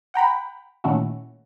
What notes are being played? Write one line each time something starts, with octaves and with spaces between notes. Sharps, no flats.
F#5 G5 A#5 B5
A#2 D#3 A3 C#4 E4 F#4